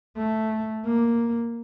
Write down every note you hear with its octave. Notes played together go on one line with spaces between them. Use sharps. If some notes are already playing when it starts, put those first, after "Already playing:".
A3
A#3